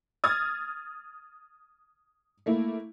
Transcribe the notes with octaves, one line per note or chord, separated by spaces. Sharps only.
D#6 F6 G#6 A6
A3 A#3 E4